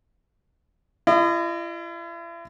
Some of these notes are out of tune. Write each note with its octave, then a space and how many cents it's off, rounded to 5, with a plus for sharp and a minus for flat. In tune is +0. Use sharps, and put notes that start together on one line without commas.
E4 +45 D#5 -25